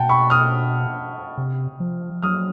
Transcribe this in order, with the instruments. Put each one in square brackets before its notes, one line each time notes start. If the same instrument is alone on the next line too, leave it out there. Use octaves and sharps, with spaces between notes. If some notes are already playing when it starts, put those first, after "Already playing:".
Already playing: [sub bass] B2 [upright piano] F#5 G5 A5
[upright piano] B5 C#6
D#6 F6
[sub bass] C3
F3
[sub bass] F#3 [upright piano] D#6 F6